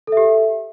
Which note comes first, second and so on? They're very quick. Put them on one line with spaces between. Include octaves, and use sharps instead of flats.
A4 E5 G4